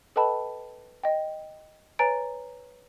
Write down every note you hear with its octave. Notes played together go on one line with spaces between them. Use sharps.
A4 B4 D#5 G5 A5 B5
D#5 G5
B4 C#5 G#5 A#5 A6 D7